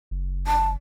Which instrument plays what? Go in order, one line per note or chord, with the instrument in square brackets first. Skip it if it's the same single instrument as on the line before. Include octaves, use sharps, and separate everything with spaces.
[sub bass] F#1
[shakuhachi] A5